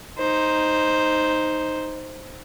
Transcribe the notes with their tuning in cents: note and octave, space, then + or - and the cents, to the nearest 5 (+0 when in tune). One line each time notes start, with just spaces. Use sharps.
D#4 +0 C5 +0